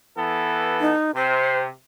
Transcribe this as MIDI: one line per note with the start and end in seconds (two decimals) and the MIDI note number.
0.18 0.93 52
0.18 0.93 59
0.18 0.93 69
0.81 1.11 63
1.15 1.69 48
1.15 1.59 72